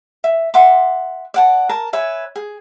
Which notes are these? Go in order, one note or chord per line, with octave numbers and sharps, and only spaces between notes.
E5
E5 F#5 C6 D6
D5 F#5 A5
A#4 A5 A#5
B4 C#5 E5 G#5
G#4